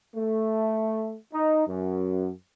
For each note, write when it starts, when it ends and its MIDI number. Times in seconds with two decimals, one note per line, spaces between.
0.15 1.16 57
1.33 1.63 63
1.68 2.30 42